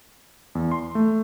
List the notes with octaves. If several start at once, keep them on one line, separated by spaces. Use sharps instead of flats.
E2
C6
A3